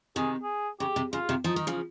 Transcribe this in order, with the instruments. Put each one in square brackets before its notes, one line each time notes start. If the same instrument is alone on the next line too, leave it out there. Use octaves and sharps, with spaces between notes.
[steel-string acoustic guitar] C3 D#3 [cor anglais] G#4
[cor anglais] G#4
[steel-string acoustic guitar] C#3 [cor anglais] G4
[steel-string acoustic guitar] C3
[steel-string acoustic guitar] C#3 [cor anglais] F4
[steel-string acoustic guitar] C3 D#3
[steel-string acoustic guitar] F3 [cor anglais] D#4
[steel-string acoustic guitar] D#3
C#3 F3